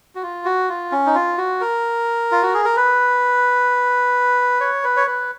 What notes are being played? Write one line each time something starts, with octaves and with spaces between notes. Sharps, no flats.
F#4
F4
F#4
F4
C#4
D#4
F4
F#4
A#4
F4
F#4
G#4
A#4
B4
C#5
B4
C#5
B4